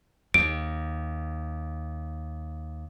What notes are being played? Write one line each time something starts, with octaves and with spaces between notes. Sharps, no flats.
D#2 D7